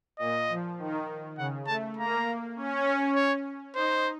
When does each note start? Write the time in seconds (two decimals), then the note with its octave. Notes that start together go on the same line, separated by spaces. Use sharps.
0.19 A#2 D#5
0.49 F3
0.78 D#3
1.37 C#3 F#5
1.67 A3 A5
1.97 A#3 A#5
2.56 C#4
3.15 C#5
3.75 D#4 C5